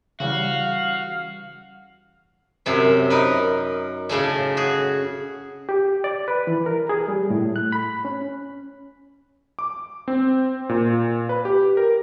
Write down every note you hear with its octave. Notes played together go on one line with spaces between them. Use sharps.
C#3 E3 G3 F#4 F5
F#2 C3 C#4
D#4 A#4 B4
A2 C#3 A3 C#4
F#4 G#4
G4
D5
B4
E3
A#4
G#4
G3
A2
F#6
B5
C#4
D6
C4
A#2
B4
G4
A#4